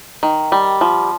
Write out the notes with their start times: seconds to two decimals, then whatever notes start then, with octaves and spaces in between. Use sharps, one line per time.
0.23 D#3
0.52 G3
0.81 F3